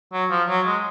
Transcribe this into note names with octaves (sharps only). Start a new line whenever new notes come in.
F#3
F3
F#3
G#3